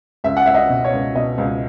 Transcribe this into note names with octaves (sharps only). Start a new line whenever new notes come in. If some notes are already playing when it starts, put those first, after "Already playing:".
C#2 E5
F#5
C#2 E5
D#5
B2
C#5
C#2
B2 D#5
C#2